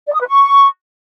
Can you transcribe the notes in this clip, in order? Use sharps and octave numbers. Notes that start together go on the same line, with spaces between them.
D5
D#6
B4
C#6